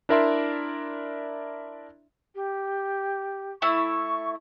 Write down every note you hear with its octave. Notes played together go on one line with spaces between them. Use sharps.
D4 E4 A#4 D5 E5 C6
G4
A3 E4 C#6